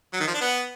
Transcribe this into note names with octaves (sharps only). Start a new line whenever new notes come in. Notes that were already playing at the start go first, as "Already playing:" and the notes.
F#3
D#3
F3
D4
B3